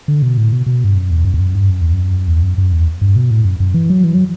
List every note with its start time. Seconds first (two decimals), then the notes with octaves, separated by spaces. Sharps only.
0.08 D3
0.22 B2
0.37 A2
0.52 B2
0.66 B2
0.84 G2
0.95 F#2
1.11 E2
1.25 F#2
1.34 E2
1.40 F#2
1.55 G2
1.69 F#2
1.81 E2
1.93 F#2
2.28 E2
2.42 F#2
2.58 F#2
2.73 E2
3.01 G2
3.16 B2
3.31 A2
3.45 F#2
3.60 F#2
3.74 E3
3.90 F#3
4.04 E3
4.14 F#3